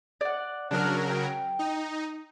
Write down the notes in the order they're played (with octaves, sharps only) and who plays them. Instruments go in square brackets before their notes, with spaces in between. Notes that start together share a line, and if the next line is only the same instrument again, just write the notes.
[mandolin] D5 F#5
[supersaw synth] C#3 F#3 A#4 [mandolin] D4 F6
[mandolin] G5
[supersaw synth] D#4